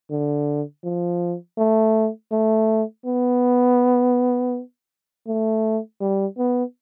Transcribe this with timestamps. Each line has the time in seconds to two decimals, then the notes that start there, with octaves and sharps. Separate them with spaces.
0.11 D3
0.84 F3
1.58 A3
2.32 A3
3.06 B3
5.27 A3
6.01 G3
6.38 B3